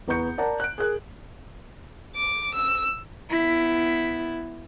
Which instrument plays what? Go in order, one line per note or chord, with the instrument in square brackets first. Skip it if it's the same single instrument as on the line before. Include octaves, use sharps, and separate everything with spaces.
[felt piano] E2 B3 A#5 C#6 G6 C#7
A#4 D5 F#5 A5 A#5
F#6 D7
G#4 A#4 F#6
[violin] D6
E6
[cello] B3 E4